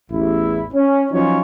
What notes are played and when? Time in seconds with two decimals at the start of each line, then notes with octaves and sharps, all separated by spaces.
0.11 A1 E2 E4
0.73 C#4
1.11 F3 F#3 C#4 D#4 F4 C#5